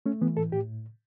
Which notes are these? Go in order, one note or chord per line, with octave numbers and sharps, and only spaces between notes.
A3 C#4
E3 B3
A2 A4
A2 G4